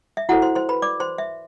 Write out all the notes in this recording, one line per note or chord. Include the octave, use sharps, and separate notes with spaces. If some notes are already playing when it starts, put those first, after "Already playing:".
E5
E4 F#4 A4 C5 F#5
C5 C6
C5 C6
B4 B5
D5 D6
C5 C6
E5